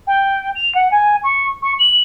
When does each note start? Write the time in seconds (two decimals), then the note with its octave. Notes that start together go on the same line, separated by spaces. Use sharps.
0.07 G5
0.55 F7
0.74 F#5
0.91 G#5
1.23 C#6
1.62 C#6
1.79 F#7